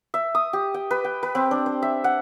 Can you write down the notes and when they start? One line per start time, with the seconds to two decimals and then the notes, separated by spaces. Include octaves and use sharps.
0.14 E5
0.35 D#6
0.53 G4
0.74 G5
0.91 B4
1.05 G5
1.23 B4
1.35 C4
1.51 D4
1.66 C5
1.82 E5
2.04 F#5